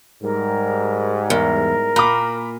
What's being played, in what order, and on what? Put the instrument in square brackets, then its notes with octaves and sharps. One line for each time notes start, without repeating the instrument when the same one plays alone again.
[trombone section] G#2 G3 [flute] A#4
[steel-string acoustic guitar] E2 [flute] A#4
[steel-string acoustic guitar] A#2 [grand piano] A#5 B5 D6